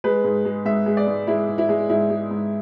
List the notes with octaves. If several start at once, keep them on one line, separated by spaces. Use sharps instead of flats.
G#3 B4
G#2
G#3
G#2 E5
G#3
D5
G#2
G#3 E4
G#2
E4
G#3
G#2 E4
G#3
G#2